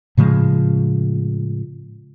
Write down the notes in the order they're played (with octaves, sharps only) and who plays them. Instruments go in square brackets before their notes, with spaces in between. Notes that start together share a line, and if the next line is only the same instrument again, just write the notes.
[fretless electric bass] A2 C#3 F3 G#3